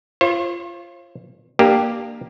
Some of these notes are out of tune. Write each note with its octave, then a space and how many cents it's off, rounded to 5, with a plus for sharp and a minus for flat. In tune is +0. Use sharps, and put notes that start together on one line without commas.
F4 -25 C5 +45
A#3 +0 D4 +25 G4 +0